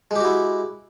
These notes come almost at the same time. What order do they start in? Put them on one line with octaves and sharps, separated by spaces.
G#3 G4 F#4 E4